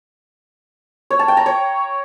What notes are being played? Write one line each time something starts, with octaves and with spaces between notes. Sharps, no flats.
C#5
A5
G5
A#5
C#5